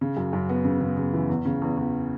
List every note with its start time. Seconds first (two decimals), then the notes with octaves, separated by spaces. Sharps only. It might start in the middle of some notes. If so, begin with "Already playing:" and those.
0.01 C#3
0.17 F#2
0.33 F#2
0.49 B3
0.65 C#3
0.81 C#3
0.97 C#3
1.13 E3
1.30 E2
1.45 C#3
1.62 E2
1.77 E2